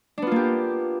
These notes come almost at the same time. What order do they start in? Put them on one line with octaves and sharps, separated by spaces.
D4 B3 F4 A#3 G4